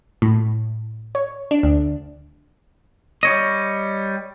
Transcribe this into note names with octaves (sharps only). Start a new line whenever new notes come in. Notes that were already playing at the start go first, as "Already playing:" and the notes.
A2
C#5
D4
D2
G3 C#5 D#5